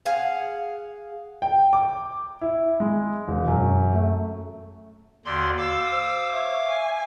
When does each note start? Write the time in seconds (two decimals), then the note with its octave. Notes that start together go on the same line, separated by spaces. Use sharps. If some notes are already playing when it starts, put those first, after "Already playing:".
0.05 G#4 F5 F#5
1.42 G5
1.73 D6
2.41 E4
2.80 G#3
3.28 E1
3.48 F#2
3.93 A3
5.25 D#2 D3 F#4 D5 C6
5.57 F5 D6 E6
5.92 C5
6.32 C#5 E5
6.67 G#5